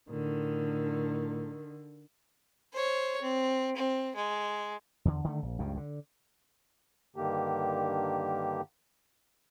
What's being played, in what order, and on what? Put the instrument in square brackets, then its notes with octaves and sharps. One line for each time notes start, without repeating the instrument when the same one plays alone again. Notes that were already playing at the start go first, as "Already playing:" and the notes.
[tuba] A2 [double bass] D3 [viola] D#3
[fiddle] C5 C#5
C4
C4
G#3
[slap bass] E2 D3
D3 D#3 G3 A3
A#1
C#2 G2 C#3
D3
[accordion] G2 D3 D#3 A#3 G4